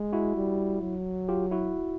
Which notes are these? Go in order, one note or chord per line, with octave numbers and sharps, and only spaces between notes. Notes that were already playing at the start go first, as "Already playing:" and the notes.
Already playing: G#3
E4 F#4
G3
F#3
F4 G4
E4 F#4